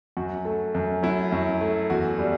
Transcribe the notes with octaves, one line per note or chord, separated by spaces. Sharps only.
F#2 F#4
A3
F#2
F#3 E4
F#2
A3
E2 F#4
G3